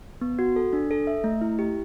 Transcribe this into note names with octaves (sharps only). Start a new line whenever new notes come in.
B3
F#4
A4
D4
A4
E5
A3
E4
G4